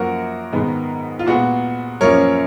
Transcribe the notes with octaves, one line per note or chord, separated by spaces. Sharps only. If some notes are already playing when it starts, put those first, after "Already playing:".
Already playing: F#2 F3 A#3 F#4 A#4
G#2 D#3 G#3 B3
F4
A#2 G#3 B3 F#4
F#2 F3 A#3 C#4 A#4 C#5